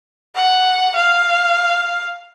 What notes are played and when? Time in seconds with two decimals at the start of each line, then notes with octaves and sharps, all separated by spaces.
0.35 F#5
0.96 F5